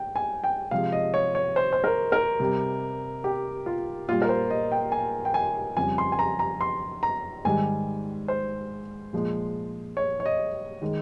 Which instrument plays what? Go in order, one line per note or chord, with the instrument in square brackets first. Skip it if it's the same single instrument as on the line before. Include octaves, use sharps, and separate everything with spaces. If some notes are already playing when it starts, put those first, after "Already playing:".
Already playing: [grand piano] G5
G#5
G5
C3 F3 G#3 F5
D#5
C#5
C#5
C5
C5
A#4
A#4
C3 G3
G4
F4
A#2 G3 F4
A#4
C5
D#5
G5
G#5
G5
G#5
F2 C#3 G3 G#5
C6
G#5
A#5
A#5
C6
A#5
G#2 D#3 G3 G#5
C5
A#2 F3 G#3
C#5
C#5
D#5
D#3 G#3